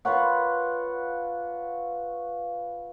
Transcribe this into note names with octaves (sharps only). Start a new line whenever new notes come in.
F4 B4 C#5 F#5